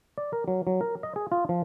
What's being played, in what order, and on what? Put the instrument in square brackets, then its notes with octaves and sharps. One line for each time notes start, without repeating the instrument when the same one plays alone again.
[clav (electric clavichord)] D5
A#4
F#3
F#3
A#4
D#5
G#4
F4
F3